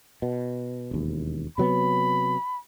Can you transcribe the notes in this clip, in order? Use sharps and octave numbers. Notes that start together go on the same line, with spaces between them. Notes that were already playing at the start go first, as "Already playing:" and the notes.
B2
E1 D#2
C3 F#3 B3 B5